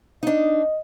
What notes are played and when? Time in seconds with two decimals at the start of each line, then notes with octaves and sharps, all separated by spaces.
0.23 D4 D#4 D#5